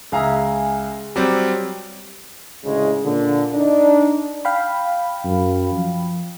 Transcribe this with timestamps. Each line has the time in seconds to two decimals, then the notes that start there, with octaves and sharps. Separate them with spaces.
0.12 C#2 G#4 E5 F5 A#5
1.16 F#3 G3 C4 G4 D6
2.65 D2 A2 C#3 G#3
3.04 A#2 D3
3.54 D4 D#4
4.45 F5 G5 B5
5.24 F#2
5.73 F3